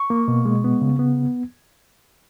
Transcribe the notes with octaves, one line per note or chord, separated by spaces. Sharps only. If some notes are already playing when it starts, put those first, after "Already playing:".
Already playing: C#6
A#3
B2
G#3
B3
C#3
B3